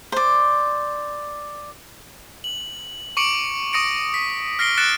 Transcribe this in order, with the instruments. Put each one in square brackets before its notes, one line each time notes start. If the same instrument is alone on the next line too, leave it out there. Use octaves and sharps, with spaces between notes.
[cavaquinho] C5 D5
[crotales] F#7
C#6 D6 C#7 D7 F#7
C#6 D#6 A#6 C#7 D7
B6
F6 A#6 C7 D7 G7
F#6 A6 C#7 D7 E7